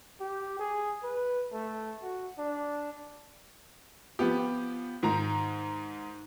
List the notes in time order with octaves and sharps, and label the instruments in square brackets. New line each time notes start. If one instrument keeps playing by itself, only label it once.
[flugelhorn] G4
G#4
B4
A3
F#4
D4
[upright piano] F3 B3 G4
G#2 D#3 A#5